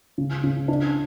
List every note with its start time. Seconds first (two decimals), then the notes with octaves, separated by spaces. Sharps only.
0.18 C#3
0.44 C#3
0.68 D4